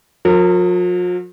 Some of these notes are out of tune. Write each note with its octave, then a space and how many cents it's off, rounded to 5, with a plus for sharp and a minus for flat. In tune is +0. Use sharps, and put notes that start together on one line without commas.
F3 +45 A#4 -30